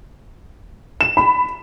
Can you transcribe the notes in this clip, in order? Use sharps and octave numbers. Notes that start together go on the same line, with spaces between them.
E7
B5